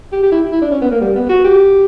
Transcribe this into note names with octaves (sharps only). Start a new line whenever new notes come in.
G4
G4
E4
E4
D4
C#4
B3
A#3
G3
B3
F#4
G4